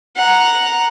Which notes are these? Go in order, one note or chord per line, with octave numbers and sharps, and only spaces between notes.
F#5 A#5